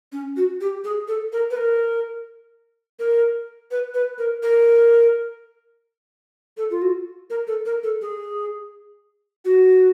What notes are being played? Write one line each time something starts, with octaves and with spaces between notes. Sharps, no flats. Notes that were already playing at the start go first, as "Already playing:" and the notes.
C#4
F#4
G4
G#4
A4
A#4
B4
A#4
A#4
B4
B4
A#4
A#4
A4
F4
F#4
A#4
A4
A#4
A4
G#4
F#4